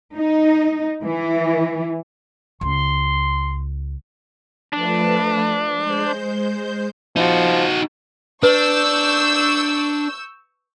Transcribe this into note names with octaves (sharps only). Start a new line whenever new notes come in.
D#4
E3
C#2 C6
F3 A3 D4 B4
G#3 C5 G6
F3 D#4 F#4
D4 B4 C#6 E6 G6